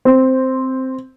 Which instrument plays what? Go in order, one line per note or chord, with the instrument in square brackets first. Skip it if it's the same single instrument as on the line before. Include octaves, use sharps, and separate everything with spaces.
[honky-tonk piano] C4